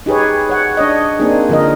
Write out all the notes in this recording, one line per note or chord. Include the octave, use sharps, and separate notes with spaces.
D#4 G4 G#4 B4 C#5
C#5 F#5
D4 C#5 D#5
A#3 C4 D4 D#4 G#4
D3 F3 D#4 A#4 D#5